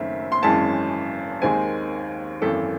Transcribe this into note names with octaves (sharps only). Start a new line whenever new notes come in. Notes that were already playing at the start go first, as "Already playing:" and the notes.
Already playing: F#1 F#2 D#3 A3 C4 E5
C6
G#1 F#2 E3 G#3 C#4 A5
D#2 D#3 G#3 C4 G#5
G#1 F#2 E3 A4